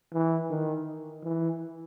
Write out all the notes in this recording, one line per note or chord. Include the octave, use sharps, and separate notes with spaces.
E3
D#3
E3